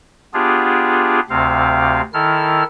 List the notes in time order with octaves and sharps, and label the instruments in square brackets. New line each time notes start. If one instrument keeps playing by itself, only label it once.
[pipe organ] B3 D4 F4 G4 G#4
D2 C3 C4 F5
D#3 E4 A4 F6